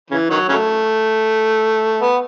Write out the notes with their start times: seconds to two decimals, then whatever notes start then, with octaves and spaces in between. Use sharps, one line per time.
0.11 C#3 E3
0.30 D#3 F#3
0.49 C#3 F#3 A3
2.02 B3